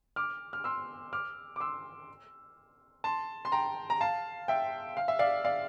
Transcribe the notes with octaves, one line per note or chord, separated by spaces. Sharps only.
D6 F6
F6
C6 E6
D6 F6
D6
C6 E6
A5 C6
C6
G5 A#5
A#5
F5 A5
E5 G5
F5
E5
D5 F5
D5 F5